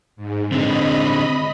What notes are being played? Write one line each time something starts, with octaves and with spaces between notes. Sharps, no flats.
G#2
D3 C4 D#5 B5